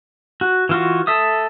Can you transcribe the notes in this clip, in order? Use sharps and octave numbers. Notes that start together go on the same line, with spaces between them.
F#4
E3 F4 F#4
A4 E5 D#6